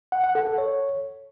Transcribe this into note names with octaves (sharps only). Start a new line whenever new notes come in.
F#5
F#5
A4
A4
C#5